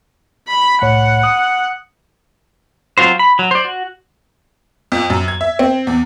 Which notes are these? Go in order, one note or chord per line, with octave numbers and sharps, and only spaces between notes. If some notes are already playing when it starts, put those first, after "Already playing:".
B5
C2 A2 C#5 F#5
D#6
F#3 C4 F4 F#4 C5
B5
F#3
C5 D5
F#4
F2
F#2
G#6
E5
C4
E2